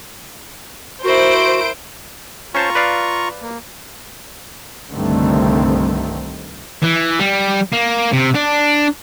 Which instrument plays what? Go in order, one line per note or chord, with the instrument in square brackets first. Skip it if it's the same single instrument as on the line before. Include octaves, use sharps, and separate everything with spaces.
[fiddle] E4 A#4 [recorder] F#4 [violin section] C5 D7
[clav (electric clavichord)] C#4 C5 A5 [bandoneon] F4 A#5 C#6
[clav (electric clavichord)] B4 D5 F5
[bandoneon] A#3
[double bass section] C2 G2 D3 D#3 A3 C4
[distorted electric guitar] E3
G3
A#3
C3
D4